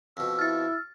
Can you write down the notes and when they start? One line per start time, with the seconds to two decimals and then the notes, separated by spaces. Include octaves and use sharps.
0.17 F2 B2 E6
0.39 E4 F6 A6